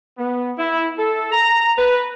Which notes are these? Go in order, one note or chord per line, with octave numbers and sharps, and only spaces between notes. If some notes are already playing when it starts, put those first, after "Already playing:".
B3
E4
A4
A#5
B4